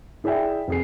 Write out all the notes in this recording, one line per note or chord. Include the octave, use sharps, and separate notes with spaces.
E4 G#4 D5 E5 G5
F1 G#4 C7